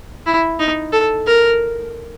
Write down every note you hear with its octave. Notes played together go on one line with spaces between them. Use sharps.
E4
D#4
A4
A#4